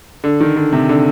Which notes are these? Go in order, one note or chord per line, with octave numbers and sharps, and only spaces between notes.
D3
D#3
D3
C3
D3